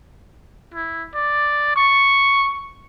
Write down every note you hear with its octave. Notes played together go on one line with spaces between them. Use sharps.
E4
D5
C#6